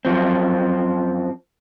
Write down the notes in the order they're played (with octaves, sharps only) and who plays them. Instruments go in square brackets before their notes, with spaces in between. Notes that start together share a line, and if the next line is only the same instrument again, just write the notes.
[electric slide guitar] F#2 F3 C4